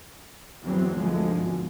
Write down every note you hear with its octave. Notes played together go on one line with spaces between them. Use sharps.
E2 G2 E3 F#3 B3 C4
G#1 D2 G2 D3 F3 G#3
B2